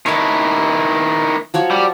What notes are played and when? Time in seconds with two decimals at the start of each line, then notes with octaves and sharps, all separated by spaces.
0.06 D#3 E4 C#5 A5
1.54 F3 F#3 C#5
1.71 G3